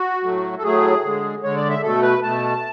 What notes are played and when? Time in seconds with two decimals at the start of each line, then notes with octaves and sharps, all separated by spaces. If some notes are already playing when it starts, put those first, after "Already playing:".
Already playing: F#4
0.23 A2 F#3 A3
0.58 A4
0.63 A2 F#3 A3 G#4
1.03 D3 G#3
1.43 D3 G#3 C#5
1.56 D5
1.70 E5
1.83 B2 A3 A4
2.02 B4
2.22 B2 A3 A5